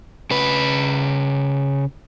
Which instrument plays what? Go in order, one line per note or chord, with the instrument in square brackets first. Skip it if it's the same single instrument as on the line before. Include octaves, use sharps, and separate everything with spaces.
[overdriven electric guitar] C#3 B4